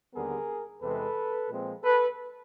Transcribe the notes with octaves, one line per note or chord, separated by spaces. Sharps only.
D#2 D3 G3 B3 G#4 A#4
E2 C3 E3 G#3 A4 B4
A#2 F3 G#3 C4
A4 B4